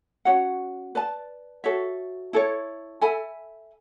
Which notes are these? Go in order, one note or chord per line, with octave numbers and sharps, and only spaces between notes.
C#4 F#4 C#5 F#5
B4 D5 A5
F#4 A4 C#5 E5
E4 A4 C#5
A4 E5 G#5 B5